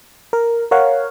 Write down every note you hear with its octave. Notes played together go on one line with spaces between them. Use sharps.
A#4
A#4 C#5 F5 F#5